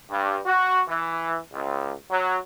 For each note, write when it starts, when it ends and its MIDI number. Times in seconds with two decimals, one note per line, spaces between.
0.10 0.37 43
0.45 0.81 66
0.88 1.37 52
1.53 1.91 37
2.10 2.37 54